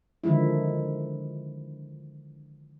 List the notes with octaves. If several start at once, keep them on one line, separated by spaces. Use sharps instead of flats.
D3 D#3 F3 G#3 E4